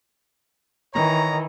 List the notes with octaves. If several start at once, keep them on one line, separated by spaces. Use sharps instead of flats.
D#3 E3 C#5 A#5